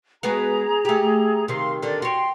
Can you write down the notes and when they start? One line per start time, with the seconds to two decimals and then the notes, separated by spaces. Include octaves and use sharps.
0.23 G#3 B3 F#4 G#4 A#5
0.85 A3 G4
1.48 C3 D#3 F5 C6
1.83 D3 D#3 D5
2.02 F#4 C#5 G5 C6